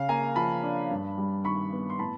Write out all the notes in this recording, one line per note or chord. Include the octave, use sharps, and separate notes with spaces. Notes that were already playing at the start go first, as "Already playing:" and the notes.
Already playing: C#3 F5
A#3 G#5 A#5
F3 A5 B5
D4
G2
G3
D#3 B5 C#6
B3
C6
A2 A5 B5